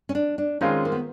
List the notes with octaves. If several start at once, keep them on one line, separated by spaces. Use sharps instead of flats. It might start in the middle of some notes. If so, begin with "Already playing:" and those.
C#4
D4
D4
D#3 G#3 C4 C#4 F4 G#4
A#3
B3